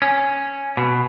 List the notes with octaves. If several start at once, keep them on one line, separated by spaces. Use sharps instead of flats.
C#4
B2